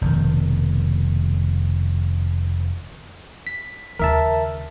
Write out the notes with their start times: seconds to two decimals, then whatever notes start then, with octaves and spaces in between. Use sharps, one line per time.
0.01 F1 B2 D#3
3.47 B6
3.99 D#2 C#3 A#4 E5 A5